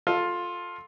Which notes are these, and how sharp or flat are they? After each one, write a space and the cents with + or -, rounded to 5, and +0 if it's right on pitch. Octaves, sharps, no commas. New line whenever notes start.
F4 +10 A4 +0